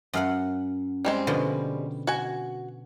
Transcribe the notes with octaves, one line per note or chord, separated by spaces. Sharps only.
F#2 F5 F#5
G3 G#3 C4
B2 D3 F3
F#4 G#5